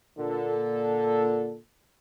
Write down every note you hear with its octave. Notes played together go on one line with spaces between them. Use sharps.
A#2 D3 A4